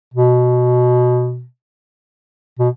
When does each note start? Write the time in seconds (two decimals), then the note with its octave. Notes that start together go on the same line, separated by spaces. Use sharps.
0.14 B2
2.59 B2